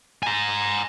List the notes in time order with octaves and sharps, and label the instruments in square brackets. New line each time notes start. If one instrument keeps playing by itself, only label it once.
[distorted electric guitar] G#5 A#5